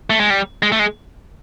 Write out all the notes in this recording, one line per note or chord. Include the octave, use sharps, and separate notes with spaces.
A3
G#3
G3
G#3
A3
G#3